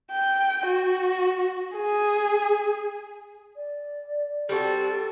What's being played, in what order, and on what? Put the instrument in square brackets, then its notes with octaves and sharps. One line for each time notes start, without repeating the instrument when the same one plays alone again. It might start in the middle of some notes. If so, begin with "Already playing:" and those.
[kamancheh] G5
F#4
G#4
[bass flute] D5
[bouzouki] G3 C4 F#4 [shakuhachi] A4